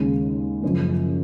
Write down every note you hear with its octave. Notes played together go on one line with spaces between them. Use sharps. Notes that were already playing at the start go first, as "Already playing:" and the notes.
Already playing: D#2 C#3 G#3
F#1 F#2 C#3 F3